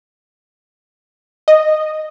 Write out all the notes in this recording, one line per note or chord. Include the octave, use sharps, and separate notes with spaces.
D#5